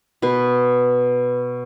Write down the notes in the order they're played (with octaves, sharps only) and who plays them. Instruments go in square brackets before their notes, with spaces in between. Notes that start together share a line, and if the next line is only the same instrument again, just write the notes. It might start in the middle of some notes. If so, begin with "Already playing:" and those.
[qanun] B2 B4